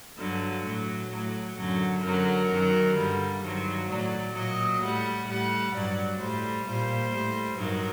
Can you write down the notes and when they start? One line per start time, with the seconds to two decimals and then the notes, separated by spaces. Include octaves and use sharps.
0.19 G2 D3 F#3
0.64 A2 F#3
1.11 A2 F#3
1.57 F#2 D3 F#3
2.03 F#2 D3 F#3 A#4
2.49 F#2 D#3 F#3
2.96 G2 D3 G3
3.42 G2 D#3 F#3 C5
3.88 A2 F#3 D5
4.34 A#2 F#3 D#5
4.81 A2 G3 F#5
5.27 A2 G3 F#5
5.74 G2 F#3 D5
6.19 A2 G3 C5
6.66 A#2 G3 C5
7.12 A2 G3
7.58 G2 D#3 F#3 A#4